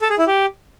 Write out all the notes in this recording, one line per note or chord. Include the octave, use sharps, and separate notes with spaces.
A4
G#4
E4
G4